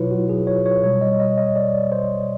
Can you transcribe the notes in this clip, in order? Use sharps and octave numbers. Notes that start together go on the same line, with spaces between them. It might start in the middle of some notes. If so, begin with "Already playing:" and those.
Already playing: B2 F#3 E4 F4 B4 C#5
F#4
G#4
C#5
C#5
B2 G3 C#5
D#5
D#5
D#5
D5
C5